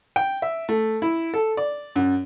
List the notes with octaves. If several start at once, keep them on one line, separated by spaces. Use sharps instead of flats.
G5
E5
A3
E4
A4
D5
F#2